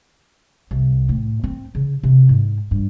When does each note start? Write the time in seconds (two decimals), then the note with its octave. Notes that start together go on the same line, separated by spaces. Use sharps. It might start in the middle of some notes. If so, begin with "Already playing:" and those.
0.71 C2
1.09 A2
1.44 C4
1.75 C#3
2.03 C3
2.29 G#2
2.71 G2